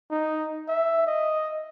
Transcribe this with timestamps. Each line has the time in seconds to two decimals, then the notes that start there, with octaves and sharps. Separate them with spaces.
0.11 D#4
0.68 E5
1.07 D#5